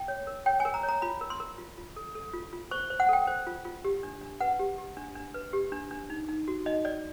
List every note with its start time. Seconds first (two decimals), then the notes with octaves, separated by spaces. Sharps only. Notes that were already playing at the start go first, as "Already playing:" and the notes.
Already playing: G5
0.08 C#5
0.27 A#4
0.46 C#5 G5
0.60 G#5
0.65 A#4
0.74 A#5
0.83 C#5
0.89 A#5
1.02 F4 B5
1.21 A#4
1.30 C6
1.40 A#4
1.58 F4
1.78 F4
1.96 A4
2.15 A4
2.34 F4
2.53 F4
2.71 C5 C#6
2.90 C5
3.00 F#5
3.09 A4 G5
3.27 C5
3.47 F4
3.65 F4
3.84 G4
4.03 D4
4.21 D4
4.40 B4 F#5
4.59 G4
4.78 G4
4.97 D4
5.15 D4
5.34 B4
5.53 G4
5.72 D4
5.91 D4
6.10 D#4
6.29 D#4
6.48 F#4
6.66 D#4 D#5
6.85 D#4 D5